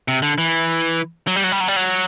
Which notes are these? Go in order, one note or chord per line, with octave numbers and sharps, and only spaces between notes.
C3
D3
E3
F#3
G3
F#3
G3
F#3
G3
F#3